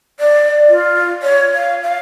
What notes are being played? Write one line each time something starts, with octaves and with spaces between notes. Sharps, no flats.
D5
F4
C#5
F5
F5